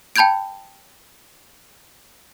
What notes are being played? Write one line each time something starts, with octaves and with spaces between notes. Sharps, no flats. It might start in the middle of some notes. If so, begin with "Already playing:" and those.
G5 A5 B5 G6 G#6 D7